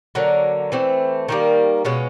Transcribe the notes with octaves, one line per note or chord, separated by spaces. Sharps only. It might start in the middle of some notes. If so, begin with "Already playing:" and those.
D3 F#3 A#3
E3 A3 C4
D#3 G3 A#3
B2 G#3 C#4 F4